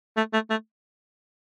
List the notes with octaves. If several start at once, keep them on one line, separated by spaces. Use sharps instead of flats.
A3
A3
A3